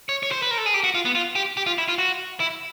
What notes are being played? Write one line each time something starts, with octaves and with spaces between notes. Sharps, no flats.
C#5
C#5
C5
B4
A#4
A4
G#4
G4
F#4
F4
B3
F4
G4
G4
F4
E4
F4
F#4
E4